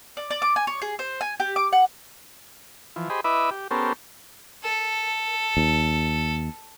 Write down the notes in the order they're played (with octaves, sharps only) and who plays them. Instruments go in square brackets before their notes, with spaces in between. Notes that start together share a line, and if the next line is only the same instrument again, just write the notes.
[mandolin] D5
D5
D6
G#5
C#5
G#4
C5
G#5
G4
D6
F#5
[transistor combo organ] E3 F3
G4 G#4 C5 D#5 B5
E4 B4 D#5 E5 B5 D6
G4
B3 C#4 G4 A4 A#4 C5
[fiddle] A4
[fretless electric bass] D#2